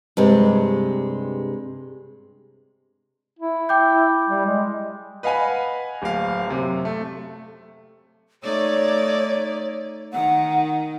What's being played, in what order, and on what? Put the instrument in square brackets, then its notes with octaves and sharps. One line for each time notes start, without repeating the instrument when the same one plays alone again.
[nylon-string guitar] G2 C3 G#3
[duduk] E4
[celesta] G5 D6 G6
[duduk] G3
G#3
[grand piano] B4 D#5 F5 F#5 G#5 B5
D1 A#3 F5
F#2 C3
A3
[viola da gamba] A3 D#4 D5 [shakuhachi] C#5
[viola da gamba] D#3 [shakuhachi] F#5